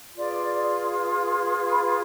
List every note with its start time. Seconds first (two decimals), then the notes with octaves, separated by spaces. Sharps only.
0.16 F4 G#4 B4 D5
1.72 B5